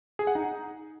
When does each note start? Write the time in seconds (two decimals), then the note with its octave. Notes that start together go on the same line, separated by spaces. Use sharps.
0.19 G#4
0.27 F#5
0.35 D#4